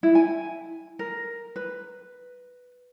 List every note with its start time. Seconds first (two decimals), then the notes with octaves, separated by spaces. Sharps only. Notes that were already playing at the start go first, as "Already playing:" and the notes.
0.03 E4
0.15 G#5
0.99 A#4
1.56 B4